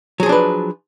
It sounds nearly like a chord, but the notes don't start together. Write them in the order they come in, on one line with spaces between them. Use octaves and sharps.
F#3 G#4 F3 D4 B4